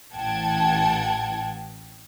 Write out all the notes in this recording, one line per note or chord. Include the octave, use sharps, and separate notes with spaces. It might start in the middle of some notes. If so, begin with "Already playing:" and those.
A1 E3 F#5 G5 A5 G#6